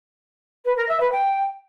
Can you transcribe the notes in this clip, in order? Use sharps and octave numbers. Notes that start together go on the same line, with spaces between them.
B4
A#4
E5
B4
G5